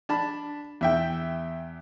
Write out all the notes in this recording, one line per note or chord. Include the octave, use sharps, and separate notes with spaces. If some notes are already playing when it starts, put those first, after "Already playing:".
D4 A5 B5
E2 E5 G5